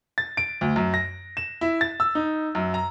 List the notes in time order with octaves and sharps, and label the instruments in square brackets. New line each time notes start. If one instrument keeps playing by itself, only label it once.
[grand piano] A6
D7
D2
F#2
A#6
E7
E4
A6
E6
D#4
F#2
A#5